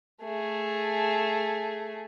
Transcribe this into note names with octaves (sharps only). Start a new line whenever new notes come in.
A3 G#4